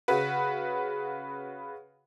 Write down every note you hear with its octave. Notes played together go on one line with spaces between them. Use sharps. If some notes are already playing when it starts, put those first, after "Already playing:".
C#3 F#4 B4